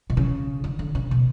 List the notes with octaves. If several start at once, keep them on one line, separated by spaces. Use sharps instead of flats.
B2
C#3
D3
D3
C#3
B2